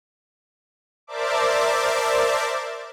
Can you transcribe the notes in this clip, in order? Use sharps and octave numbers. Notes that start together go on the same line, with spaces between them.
A#4 C5 D5 E5 A5 D6